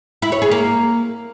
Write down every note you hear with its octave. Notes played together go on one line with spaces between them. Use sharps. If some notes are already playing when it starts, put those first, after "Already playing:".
E4
C#5
G#4
A#3